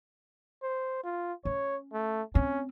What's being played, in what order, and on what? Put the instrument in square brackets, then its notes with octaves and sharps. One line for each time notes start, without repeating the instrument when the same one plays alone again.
[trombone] C5
F4
[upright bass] C#4 [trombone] C#5
[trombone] A3
[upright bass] C4 [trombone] C#4